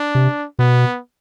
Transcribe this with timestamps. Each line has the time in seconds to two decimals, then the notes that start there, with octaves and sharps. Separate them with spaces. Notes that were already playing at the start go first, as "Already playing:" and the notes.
Already playing: D4
0.15 C3
0.59 B2 B3